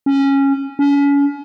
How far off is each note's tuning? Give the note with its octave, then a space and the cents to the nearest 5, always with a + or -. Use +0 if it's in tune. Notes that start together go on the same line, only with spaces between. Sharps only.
C#4 -10
C#4 +35